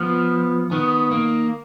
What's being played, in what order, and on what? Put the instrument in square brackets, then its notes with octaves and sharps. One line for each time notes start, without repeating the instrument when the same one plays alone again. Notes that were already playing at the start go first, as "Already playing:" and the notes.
Already playing: [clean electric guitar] F3 [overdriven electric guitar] B3
[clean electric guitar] D#3 [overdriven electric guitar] B3
[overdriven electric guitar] A#3